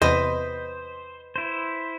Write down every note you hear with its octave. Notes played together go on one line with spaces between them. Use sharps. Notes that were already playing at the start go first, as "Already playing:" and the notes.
E2 C3 B4 C5 D#5
E4 C5